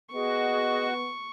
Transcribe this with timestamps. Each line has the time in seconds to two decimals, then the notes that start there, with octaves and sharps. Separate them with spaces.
0.14 B3 F#4 G#4 D#5 C#6